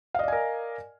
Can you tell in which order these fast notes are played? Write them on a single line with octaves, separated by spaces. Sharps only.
F5 D#5 D5 G#5 A#4